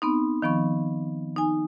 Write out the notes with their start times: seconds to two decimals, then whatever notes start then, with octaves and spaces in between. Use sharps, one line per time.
0.02 B3 C4 D#4
0.42 D#3 F3 B3 C#6
1.36 D#4 G#5